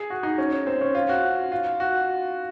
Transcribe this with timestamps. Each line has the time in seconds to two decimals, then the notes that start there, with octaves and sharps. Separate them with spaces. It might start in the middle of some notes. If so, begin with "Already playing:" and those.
Already playing: G#4
0.10 F#4
0.23 D#4
0.38 C#4
0.66 C4
0.81 C#4
0.95 F4
1.09 F#4
1.52 F4
1.80 F#4